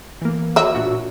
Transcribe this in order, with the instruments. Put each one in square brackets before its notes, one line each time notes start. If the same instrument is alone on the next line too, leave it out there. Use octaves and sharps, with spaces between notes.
[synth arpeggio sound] E3 A#3
[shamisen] F#3 E5
[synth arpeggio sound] A#2 D4 F#4